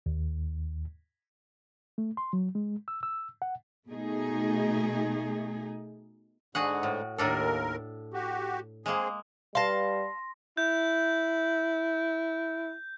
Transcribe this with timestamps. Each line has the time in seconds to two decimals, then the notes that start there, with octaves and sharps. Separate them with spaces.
0.06 D#2
1.98 A3
2.17 C6
2.33 F#3
2.55 G#3
2.88 E6
3.03 E6
3.42 F#5
3.89 B2 A3 D#4 G#4
6.55 G#2 D3 F#4 G#4 F#5
6.83 A2
7.18 D#2 A2 D4 A4 A#4
8.14 F#4 G4
8.86 G#3 A#3 C4 G#4
9.55 G3 B4 F5 A5 C6 A#6
10.57 E4 G6